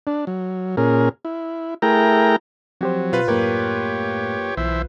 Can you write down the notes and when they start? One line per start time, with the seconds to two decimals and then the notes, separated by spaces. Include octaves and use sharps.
0.07 D4
0.27 F#3
0.77 A#2 C#4 G#4 A#4
1.25 E4
1.82 A3 E4 G#4 A#4 G5 A#5
2.81 F3 F#3 C4 G4 C5
3.13 B2 F4 B4
3.28 F#2 A2 A#3 G4 A#4 C#5
4.57 B1 E3 C5 E5